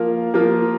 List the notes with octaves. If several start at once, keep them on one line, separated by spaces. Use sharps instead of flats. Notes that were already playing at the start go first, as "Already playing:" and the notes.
Already playing: F3 A#3 F4 A#4
F3 A#3 F4 A#4